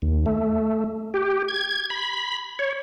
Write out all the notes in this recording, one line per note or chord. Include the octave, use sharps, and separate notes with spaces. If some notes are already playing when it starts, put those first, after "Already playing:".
D#2
A3
G4
G#6
B5
C#5